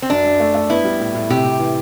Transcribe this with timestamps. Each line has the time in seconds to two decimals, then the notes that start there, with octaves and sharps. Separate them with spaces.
0.02 C4
0.10 F#2 D4
0.25 F#2
0.40 A3
0.55 A3
0.70 B3 E4
0.84 G3
1.00 A2
1.15 A2
1.30 C3 G4
1.45 C3
1.59 E3